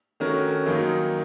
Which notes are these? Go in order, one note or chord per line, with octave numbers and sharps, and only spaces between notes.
D#3 A3 C#4 F#4 A#4
F#2 D#3 F#3 A#3 D#4